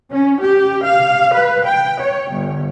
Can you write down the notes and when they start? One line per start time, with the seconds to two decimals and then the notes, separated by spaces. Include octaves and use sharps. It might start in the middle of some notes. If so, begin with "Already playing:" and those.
0.10 C#4
0.41 G4
0.86 F5
1.32 B4
1.65 G5
2.00 C#5
2.31 G1